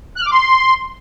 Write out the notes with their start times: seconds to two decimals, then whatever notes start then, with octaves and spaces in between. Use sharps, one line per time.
0.17 F#6
0.22 F6
0.27 D6
0.32 C6